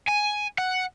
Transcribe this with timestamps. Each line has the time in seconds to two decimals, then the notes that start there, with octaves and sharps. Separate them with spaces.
0.08 G#5
0.58 F#5